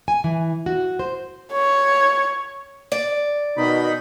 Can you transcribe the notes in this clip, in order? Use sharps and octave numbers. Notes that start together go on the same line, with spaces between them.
G#5
E3
F#4
C5
C#5
D5
B2 D#3 D#4 B5